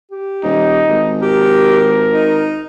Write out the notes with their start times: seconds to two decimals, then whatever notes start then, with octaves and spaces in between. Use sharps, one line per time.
0.12 G4
0.44 D#1 D#4
0.89 G#1
1.22 G4 A#4
2.14 D#4